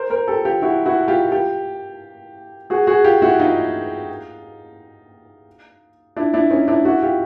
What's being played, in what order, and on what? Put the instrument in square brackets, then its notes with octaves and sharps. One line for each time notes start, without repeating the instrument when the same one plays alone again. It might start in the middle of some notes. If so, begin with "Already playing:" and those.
Already playing: [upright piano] A#4 C5
A#4 C5
G4 A4
F4 G4
E4 F#4
E4 F#4
F4 G4
F4 G4
F#4 G#4
F#4 G#4
F4 G4
E4 F#4
D#4 F4
D4 E4
D4 E4
C#4 D#4
D4 E4
E4 F#4
F4 G4